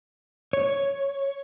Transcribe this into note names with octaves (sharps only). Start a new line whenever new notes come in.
C#5